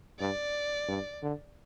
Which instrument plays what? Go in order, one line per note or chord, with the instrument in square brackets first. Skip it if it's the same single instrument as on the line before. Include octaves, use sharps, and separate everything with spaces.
[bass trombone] G2 [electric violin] D5
[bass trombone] G2
D3